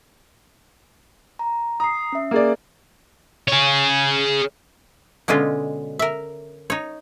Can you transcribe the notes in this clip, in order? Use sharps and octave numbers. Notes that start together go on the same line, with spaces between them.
A#5
A#5 D#6 C7
C#4 E5
A#3 G#4 D5
G#4 C#5
B2 D3 G#3 C#4 F4
A#4 E5
D#4 C#5